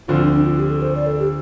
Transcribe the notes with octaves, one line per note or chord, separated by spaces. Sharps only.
D2 D3 F3 C4 F4
D4
D4
F4
G4
A4
C5
D5
A4
G4